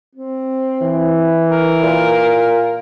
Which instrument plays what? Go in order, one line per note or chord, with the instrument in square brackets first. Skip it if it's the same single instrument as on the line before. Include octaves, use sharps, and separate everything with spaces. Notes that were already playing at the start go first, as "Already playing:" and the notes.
[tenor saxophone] C4
[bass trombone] E3
[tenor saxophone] A#4
[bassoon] A#2